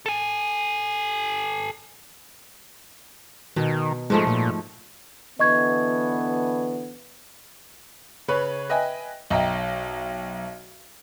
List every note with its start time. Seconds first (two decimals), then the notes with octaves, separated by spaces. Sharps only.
0.06 A4 G#5
3.56 B2 D#3
4.10 G#2 F3 G#3 A3
4.27 A#2
5.40 D3 E3 B3 D#5 C#6 G#6
8.28 C#3 C#4 B4 C#5
8.69 B4 D#5 E5 G5 G#5
9.30 B1 D#5 E5 G5 A#5